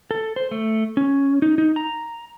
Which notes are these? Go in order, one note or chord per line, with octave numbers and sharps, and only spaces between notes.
A4
C5
A3
C#4
D#4
D#4
A#5